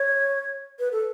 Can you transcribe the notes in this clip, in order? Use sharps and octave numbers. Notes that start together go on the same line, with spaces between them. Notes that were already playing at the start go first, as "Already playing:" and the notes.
Already playing: C#5
B4
A4